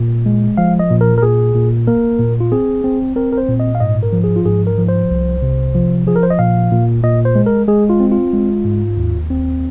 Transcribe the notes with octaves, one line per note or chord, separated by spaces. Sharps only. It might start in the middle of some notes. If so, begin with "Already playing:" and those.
Already playing: A#2
G#3
F3 F5
D#5
A#2
A#4
A#4
A#2 G#4
A#2
A#3 A#4
A#2
F4
C4 G#4
C4
C4 A#4
A#4
C5
A#2
D#5
F5
G#2 D#5
A#4
F3
G#4
F4
G#2 G#4
A#4
F3
C5
C2
C3
F3
F3 G#4
A#4
C5
D#5
A#2 F5
A#2
A#2 D#5
C5
G#3
A#4
G#3 G#4
F4
C4
F4
G#3
G#2
D#2
C4